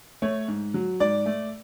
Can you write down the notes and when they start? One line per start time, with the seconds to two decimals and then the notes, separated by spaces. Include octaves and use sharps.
0.22 A3 C#5
0.48 G#2
0.74 F#3
1.00 G#2 D5
1.26 A3